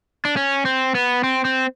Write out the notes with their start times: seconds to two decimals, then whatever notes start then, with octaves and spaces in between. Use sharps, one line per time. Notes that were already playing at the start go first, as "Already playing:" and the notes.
0.25 D4
0.37 C#4
0.65 C4
0.95 B3
1.24 C4
1.45 C4